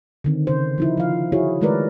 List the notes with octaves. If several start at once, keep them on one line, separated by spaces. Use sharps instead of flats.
D3 D#3 C4
C#3 C5
F3 D#4 E4
F3 F5
E4 F#4 G#4 C#5
D#3 G#3 A3 A#4 B4 D5